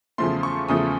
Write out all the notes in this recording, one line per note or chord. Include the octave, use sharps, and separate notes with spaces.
E2 C#3 F3 A3 C6
C#6
E2 C#3 F3 A3 D#6